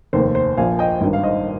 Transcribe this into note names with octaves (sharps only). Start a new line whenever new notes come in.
F1 D#2 D#3 C5
C5
A#1 A#2 F3 F5 G#5
D#5 G5
G#1 G2 D#3
F5
C5 D#5